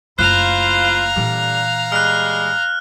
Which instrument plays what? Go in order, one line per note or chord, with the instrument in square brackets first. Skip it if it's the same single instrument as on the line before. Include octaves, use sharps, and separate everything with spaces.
[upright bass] F#1 A3 [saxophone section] E4 F4 C5 [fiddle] F5 A#5 [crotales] F#6
[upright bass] A#2 E3 [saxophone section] D3 G3
[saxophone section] G3 G#3 [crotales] F6 F#6